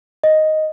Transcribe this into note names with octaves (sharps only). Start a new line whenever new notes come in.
D#5